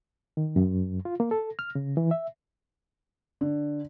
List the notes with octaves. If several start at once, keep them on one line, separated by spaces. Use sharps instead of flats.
D#3
F#2
F4
A#3
A4
F6
C#3
E3
E5
D3